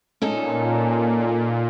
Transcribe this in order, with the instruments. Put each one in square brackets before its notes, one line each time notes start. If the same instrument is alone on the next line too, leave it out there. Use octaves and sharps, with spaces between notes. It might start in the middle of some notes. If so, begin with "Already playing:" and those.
[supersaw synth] A#2 [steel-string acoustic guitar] C#4 D#4 A4